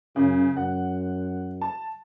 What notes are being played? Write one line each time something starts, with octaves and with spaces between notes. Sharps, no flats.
F#2 C#3
F#2 F#5
A5